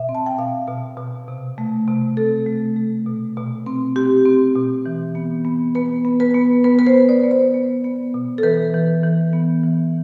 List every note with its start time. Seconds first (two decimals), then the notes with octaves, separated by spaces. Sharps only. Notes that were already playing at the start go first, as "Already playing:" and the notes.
Already playing: B2 E5
0.09 C4
0.15 A5
0.26 G5
0.38 B2 F5
0.67 B2
0.97 B2
1.28 C3
1.58 A3
1.88 C3
2.17 C4 A4
2.46 A3
2.77 A3
3.06 B2
3.37 B2
3.66 C4
3.96 C4 G4
4.25 C4
4.55 B2
4.86 E3
5.15 B3
5.45 B3
5.75 B3 B4
6.05 B3
6.20 B4
6.34 B3
6.64 B3 B4
6.79 B4
6.87 C5
6.94 B3
7.09 D5
7.24 B3
7.31 C5
7.54 B3
7.84 B3
8.14 B2
8.38 A4
8.43 E3 B4
8.74 E3
9.03 E3
9.33 B3
9.63 E3